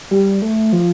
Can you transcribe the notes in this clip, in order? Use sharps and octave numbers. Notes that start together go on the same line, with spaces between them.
G3
A3
F3